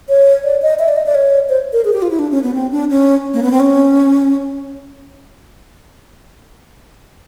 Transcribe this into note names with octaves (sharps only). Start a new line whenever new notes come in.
C#5
D5
D#5
E5
D5
D#5
D5
C#5
C5
A#4
G#4
G4
F4
E4
D4
C#4
B3
C4
D4
C#4
A#3
B3
C4
C#4